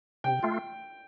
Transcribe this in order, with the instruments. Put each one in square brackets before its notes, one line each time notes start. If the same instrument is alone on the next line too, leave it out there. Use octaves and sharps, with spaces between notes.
[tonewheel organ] C3 [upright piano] G5
[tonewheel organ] A3 F4